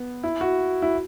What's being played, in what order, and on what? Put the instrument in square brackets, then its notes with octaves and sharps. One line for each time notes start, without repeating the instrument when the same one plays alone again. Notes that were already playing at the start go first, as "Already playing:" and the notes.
Already playing: [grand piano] B3
E4
F#4
E4